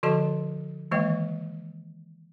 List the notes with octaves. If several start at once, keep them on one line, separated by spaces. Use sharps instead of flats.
D3 F3 F#4 A4 D#5 A5
D#3 E3 G#3 A#3 D#5 G5